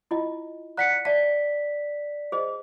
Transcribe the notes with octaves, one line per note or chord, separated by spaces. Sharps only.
E4 F4 D#5
D5 F#5 A#5 F#6 B6 C#7
D5 E5 A5 B6
G#4 C5 D#5